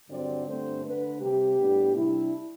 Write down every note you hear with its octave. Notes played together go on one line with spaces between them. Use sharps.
G2 D3 F#3 C4 D5
G2 D3 A3 C4 C5
D3 A3 D4 B4
C3 G3 C4 G4
A2 G3 B3 D4
C3 G3 D4 E4